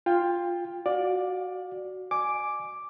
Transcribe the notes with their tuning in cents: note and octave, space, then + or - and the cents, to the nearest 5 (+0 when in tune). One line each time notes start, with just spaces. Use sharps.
F4 +0 G5 +20
F#4 +0 D5 +5 F5 +30
D#5 -45 G#5 +10 D6 +0